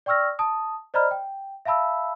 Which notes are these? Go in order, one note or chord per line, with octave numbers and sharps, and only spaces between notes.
D5 G5 C#6 E6 F6 A#6
A5 D#6
C5 D5 D#5 A#5 B5 F6
G5
E5 F5 A5 B5 E6